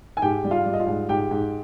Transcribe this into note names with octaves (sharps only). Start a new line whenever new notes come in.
G#5
G#2 G4 G5
G3
F4 F5
G3
D#5
F4 F5
G#2
G#2 G4 G5
G#2